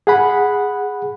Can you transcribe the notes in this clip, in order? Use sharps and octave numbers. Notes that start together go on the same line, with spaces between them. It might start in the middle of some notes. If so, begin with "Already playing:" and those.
G#4 F#5 B5